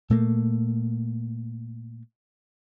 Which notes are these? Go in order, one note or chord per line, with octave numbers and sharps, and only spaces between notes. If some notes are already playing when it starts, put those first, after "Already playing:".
A#2 A3 A#3